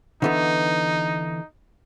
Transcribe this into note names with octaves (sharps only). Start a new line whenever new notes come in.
D3 E3 B3 D#4